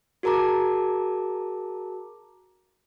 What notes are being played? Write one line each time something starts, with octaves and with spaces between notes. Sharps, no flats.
F#4 G#4 A#4 A5 A#5 D6